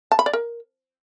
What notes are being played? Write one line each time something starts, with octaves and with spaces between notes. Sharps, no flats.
A5
B5
D5
A#4